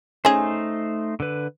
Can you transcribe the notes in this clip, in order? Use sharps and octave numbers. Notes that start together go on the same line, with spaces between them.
A3 C#4 D#4 G#4 C5
D3 B4